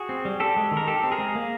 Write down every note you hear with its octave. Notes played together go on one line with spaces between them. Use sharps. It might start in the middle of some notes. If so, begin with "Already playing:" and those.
Already playing: F#4 G#4
C4
G3
C4 G4 A4
G#3
D#3
A#4
D#4 G4 A4
C4
G#4 A#4
G#3
A#3